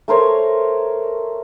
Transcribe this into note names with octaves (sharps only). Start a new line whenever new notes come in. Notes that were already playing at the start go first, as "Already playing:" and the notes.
A3 A#4 C5 C#5